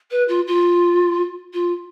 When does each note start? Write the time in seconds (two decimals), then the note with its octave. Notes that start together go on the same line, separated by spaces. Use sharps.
0.10 B4
0.28 F4
0.47 F4
1.53 F4